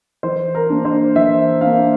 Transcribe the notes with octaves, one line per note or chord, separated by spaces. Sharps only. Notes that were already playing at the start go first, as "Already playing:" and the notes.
E3 C5
A#4
A#3 D4
C5
E3 E5
A#3 D4 F5